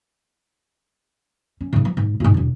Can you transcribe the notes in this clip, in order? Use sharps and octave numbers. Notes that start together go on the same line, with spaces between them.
C#4
G#2 C#3
F3
G#2
E1 G#2
E1 D4